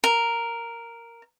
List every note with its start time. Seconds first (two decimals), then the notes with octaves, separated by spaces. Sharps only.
0.04 A#4